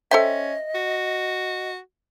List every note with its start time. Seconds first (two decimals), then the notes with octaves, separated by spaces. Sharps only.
0.11 C#4 A4 C5 D#5 E5 G5
0.74 F#4